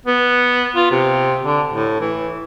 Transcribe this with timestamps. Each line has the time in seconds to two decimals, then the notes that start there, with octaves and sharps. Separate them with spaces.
0.06 B3
0.76 F4
0.91 C3
1.43 D3
1.70 A2
2.01 E3